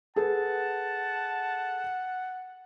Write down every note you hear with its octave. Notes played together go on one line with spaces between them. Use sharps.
G#4 A4 B4 F#5 A5